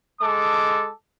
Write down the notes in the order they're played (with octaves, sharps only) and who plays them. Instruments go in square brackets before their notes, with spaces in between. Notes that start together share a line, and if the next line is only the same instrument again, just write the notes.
[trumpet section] G#3 A4 D6